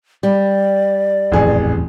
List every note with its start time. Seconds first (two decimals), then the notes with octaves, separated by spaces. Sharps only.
0.23 G3 D5
1.32 D#1 A1 F2 E3 G#4